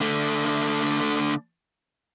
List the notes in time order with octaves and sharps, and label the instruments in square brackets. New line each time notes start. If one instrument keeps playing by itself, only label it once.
[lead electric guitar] D3 A3